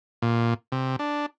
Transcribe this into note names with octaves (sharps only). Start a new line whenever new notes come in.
A#2
C3
D4